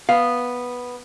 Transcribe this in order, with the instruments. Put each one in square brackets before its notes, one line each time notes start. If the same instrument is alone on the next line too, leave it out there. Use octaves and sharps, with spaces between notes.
[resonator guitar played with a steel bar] B3 [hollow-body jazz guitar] F5